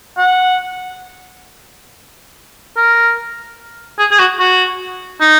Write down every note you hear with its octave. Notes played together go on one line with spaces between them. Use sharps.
F#5
A#4
G#4
G#4
F#4
F#4
D#4